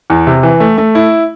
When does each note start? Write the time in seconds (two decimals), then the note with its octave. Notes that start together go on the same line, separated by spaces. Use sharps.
0.10 E2
0.27 C3
0.43 E3
0.60 A3
0.78 A3
0.95 E4